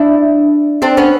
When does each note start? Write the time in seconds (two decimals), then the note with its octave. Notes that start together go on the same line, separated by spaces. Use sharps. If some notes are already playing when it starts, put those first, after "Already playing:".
Already playing: D4 E4
0.82 C4 D4
0.97 B3 C#4